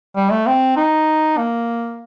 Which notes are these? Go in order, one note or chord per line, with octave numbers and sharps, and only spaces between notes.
G3
A3
C4
D#4
A#3